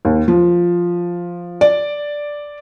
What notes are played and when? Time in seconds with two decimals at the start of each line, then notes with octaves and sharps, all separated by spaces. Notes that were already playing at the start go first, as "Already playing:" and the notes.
0.05 D#2
0.28 F3
1.61 D5